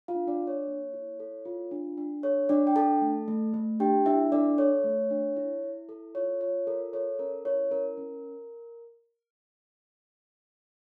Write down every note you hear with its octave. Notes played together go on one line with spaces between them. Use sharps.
F4 F5
D4
D4 D5
D4
C#5
A#3
E4
A4
F4
D4
D4
A4 C#5
D4 D5
G5
D4 A4 A5
A3
A3
A3
D4 G4 G5
D4 E4 E5
D4 A4 D5
A4 C#5
A3
D4
E4
E4
A4
F4 C#5
F4 C#5
A4 A#4
A4 C#5
C#4 A#4
E4 C#5
C#4 A#4
C#4